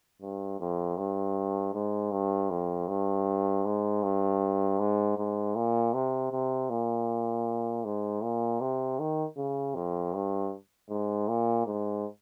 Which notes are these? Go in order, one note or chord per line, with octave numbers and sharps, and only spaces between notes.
G2
F2
G2
G#2
G2
F2
G2
G#2
G2
G#2
G#2
A#2
C3
C3
A#2
G#2
A#2
C3
D#3
C#3
F2
G2
G#2
A#2
G#2